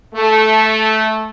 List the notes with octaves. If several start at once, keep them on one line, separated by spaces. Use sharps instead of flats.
A3